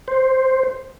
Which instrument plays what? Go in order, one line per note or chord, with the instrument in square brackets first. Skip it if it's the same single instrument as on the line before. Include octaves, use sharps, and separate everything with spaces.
[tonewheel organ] C5